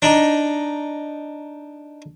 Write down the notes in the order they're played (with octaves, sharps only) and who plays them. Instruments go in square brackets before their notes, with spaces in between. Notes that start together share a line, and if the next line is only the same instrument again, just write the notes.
[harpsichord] D4 D#4